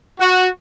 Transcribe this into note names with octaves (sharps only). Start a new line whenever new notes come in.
F#4